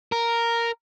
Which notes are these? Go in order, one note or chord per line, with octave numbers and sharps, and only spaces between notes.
A#4